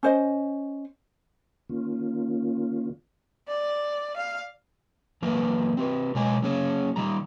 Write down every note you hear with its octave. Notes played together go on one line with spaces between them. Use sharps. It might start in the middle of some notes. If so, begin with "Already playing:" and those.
C#4 C5 D#5
D#3 A#3 C#4 F4
D5
F5
E3 F#3 A#3 A#4 B4
C4 G4 B4
B2 G#3 C#5 D#5 G#5
F#3 A#3 C#4 G#4 C#5
D#3 G3 A#5